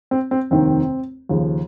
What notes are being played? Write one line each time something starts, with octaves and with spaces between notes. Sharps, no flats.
C4
C4
F1 D#2 D#3 C4
D#2 C#3 F3